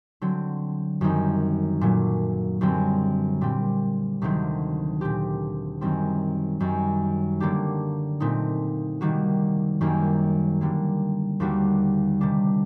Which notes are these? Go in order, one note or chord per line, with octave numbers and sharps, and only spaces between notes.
D3 F#3 C4
F#2 D#3 G3 C4 D#4
A#2 F#3 A3
F#2 D3 G3 C4
A#2 G3 C4
D2 C3 D#3 F#3 C4
A#2 A3 C4 G4
F#2 D#3 G3 C4
F#2 D#3 G3
D3 F#3 A#3 D4 G4
A#2 A3 C4 D#4
C3 D#3 G3 A#3 F#4
F#2 D#3 G3 A#3
D3 G3 A#3
D#2 D3 G3 D4 F#4
C3 D#3 G3 D4